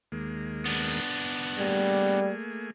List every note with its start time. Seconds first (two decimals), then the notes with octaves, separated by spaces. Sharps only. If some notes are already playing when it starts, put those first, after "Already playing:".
0.12 D#2 G#3 A#3
0.66 B3 D4
1.58 G3 A3 A#3 G#4